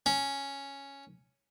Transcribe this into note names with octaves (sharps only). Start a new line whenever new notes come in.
C#4